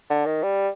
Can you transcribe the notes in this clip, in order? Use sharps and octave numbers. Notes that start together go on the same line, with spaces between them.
D3
D#3
G3